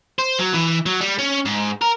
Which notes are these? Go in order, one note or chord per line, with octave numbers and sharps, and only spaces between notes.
C5
F#3
E3
F#3
G3
C#4
G#2
A#4